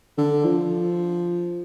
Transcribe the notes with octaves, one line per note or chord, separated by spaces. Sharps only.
D3
F3